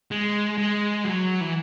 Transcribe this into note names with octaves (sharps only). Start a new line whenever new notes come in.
G#3
G#3
F#3
E3